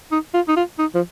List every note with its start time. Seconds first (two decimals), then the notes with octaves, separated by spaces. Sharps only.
0.12 D#4
0.34 F4
0.48 D#4
0.56 F4
0.79 D#4
0.95 F3